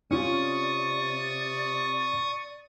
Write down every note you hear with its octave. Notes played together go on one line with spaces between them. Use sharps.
C3 C#4 F4 D5 C#6 D#6